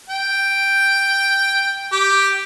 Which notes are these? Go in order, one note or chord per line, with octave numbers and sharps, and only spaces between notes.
G5
G4